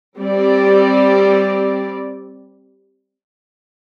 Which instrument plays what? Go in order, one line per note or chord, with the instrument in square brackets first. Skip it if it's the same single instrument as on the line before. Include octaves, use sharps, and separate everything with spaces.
[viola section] G3 C4 G4 D5